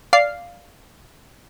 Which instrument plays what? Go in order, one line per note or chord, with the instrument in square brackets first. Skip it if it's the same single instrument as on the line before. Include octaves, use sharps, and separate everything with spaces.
[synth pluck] D5 F5 C7